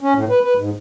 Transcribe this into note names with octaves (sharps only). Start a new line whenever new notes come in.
C#4
A2
B4
B4
G#2